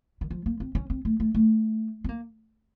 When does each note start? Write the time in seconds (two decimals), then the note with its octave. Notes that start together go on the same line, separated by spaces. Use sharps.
0.21 D#3
0.30 F3
0.46 A#3
0.60 C4
0.75 C#4
0.90 C4
1.05 A3
1.20 A3
1.35 A3
2.04 C4
2.09 A#3